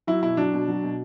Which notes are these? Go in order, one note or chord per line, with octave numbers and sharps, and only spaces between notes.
F#3 E4
B2 E4
F#3 D4
B2
F#3
B2